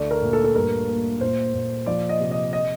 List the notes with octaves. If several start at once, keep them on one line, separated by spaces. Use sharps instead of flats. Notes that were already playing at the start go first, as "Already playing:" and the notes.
Already playing: D2 A3 D5
A#4
A#2
A4
A4
G2 A#4
A#3
A#2 C5
A#2
F3 D5
D#5
C3
D#5
D#5